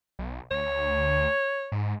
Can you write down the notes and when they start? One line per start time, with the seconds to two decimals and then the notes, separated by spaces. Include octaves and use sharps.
0.19 B1
0.51 D2 C#5
1.72 G#2